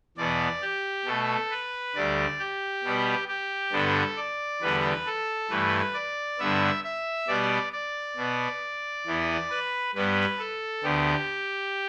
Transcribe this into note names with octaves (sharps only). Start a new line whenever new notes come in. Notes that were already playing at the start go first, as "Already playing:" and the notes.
E2 B2 B3 D5
G4
B2 A3 A4
B4
D2 D3 G3 D5
G4
B2 G3 B3
G4
G2 D3 B3 A4
D5
E2 D3 G3 B3 B4
A4
G2 E3 A3 B4
D5
G2 D3 B3 E5
E5
B2 G3 B3 D5
D5
B2 B3
E2 E3 B3
B4
G2 G3 B3 B4
A4
D2 D3 B3 G4